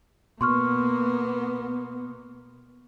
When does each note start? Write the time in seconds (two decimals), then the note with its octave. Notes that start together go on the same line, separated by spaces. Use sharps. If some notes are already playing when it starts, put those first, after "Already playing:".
0.41 B2 A#3 B3 C6 C#6 F6